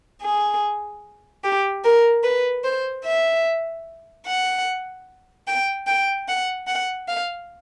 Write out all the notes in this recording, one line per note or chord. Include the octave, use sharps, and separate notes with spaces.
G#4
G4
A#4
B4
C5
E5
F#5
G5
G5
F#5
F#5
F5